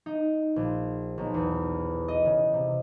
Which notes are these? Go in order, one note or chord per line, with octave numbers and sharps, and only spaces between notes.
D#4
A#1
B1
E2
D#5
C#3
C3